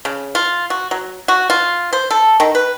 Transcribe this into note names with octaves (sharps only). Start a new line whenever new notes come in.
C#3
F4
F#4
F#3
F#4
F4
C5
A4
D#3
B4